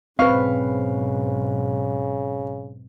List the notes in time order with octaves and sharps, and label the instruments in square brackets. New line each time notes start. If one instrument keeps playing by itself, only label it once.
[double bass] B1 G#2 [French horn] C#3 [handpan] C4 B4 [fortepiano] F5 C#6